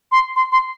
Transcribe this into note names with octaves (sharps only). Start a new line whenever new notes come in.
C6
C6
C6